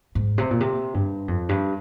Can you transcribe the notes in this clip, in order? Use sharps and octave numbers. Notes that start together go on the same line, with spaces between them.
G#2
C3
A#2
C3
G2
F2
G2